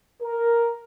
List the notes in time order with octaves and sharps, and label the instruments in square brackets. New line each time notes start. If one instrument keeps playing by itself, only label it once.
[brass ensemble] A#4